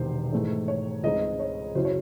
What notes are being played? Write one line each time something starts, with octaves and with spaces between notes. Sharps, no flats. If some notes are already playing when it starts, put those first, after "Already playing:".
Already playing: E1 E2 C3 D#3 C5
G#2 E3 A3
C#5
C#2 C#3 G#3 C4 D#4 D#5
C#5
F#2 C#3 F#3 C#4 E4 C5
C#5